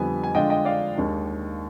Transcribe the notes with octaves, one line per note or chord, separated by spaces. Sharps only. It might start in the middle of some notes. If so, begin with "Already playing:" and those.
Already playing: F2 D3 G3 B3 G#5
G#5
D3 G#3 D4 F4 D#5 G5
D#5 G5
D5 F5
D#2 D#3 G#3 D4